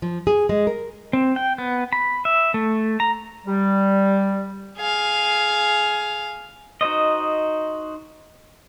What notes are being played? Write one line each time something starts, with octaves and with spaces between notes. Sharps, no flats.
F3
G#4
G#3
A#4
C4
G5
B3
B5
E5
A3
A#5
G3
G#4 F5
D#4 F#4 C5 D#5